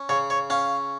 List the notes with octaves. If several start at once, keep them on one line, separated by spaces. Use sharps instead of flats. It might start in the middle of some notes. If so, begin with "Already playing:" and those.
Already playing: C#4
C#3 C#5
C#5
C#4 F5